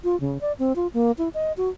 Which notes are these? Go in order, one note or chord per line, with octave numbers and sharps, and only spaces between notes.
F4
C#3
D5
C4
F4
A#3
E4
D#5
F#4